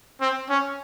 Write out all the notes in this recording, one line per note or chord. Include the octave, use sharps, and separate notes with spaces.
C4
C#4